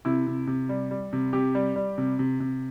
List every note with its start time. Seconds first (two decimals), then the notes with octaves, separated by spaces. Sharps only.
0.05 C3 E4
0.27 C3
0.47 C3
0.69 G3
0.91 G3
1.13 C3
1.33 C3 G4
1.55 G3
1.76 G3
1.98 C3
2.19 C3
2.40 C3